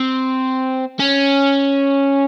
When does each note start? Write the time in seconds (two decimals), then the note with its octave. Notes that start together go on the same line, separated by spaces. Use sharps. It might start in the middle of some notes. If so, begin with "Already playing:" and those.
Already playing: C4
0.99 C#4